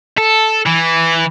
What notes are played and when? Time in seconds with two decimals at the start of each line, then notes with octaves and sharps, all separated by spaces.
0.18 A4
0.67 E3